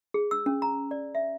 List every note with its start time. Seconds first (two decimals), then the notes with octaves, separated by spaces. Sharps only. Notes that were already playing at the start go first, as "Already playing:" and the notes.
0.14 G#4
0.31 E6
0.46 C#4
0.62 A#5
0.91 D5
1.15 E5